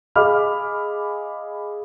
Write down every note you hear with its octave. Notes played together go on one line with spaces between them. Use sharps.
G#4 D#5 F5 B5 D6 F6